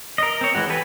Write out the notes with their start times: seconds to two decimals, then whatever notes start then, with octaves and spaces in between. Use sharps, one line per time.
0.18 A#4 D#5
0.41 C4 C#5
0.55 E3 G#3 F#4
0.70 G4 A4 B4 G#5